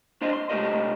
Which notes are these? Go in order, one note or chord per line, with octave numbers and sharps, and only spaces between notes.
D4 C5 D#5 C6
C6
C3 G#3 A3 G4 A#4 D#5